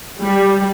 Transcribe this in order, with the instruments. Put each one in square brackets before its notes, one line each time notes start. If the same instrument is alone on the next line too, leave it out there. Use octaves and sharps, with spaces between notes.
[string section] G3